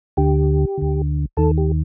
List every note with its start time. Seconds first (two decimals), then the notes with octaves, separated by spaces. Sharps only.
0.17 D2 D3 G4
0.78 D2 D3
1.37 D#2 D#3 A4
1.58 G4